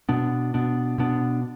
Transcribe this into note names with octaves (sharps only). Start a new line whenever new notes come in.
B2 B3 D4
B2 B3 D4
B2 B3 D4